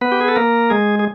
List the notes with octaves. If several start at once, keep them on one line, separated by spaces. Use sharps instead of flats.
B3 B4
G4
G#4
A4
A#3 A#4
G#3 G#4
G#4